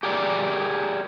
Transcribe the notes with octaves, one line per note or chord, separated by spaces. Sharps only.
G4 G#4 A#4 D5